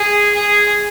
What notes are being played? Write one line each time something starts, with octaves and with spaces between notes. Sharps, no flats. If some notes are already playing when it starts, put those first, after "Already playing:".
Already playing: G#4
G#4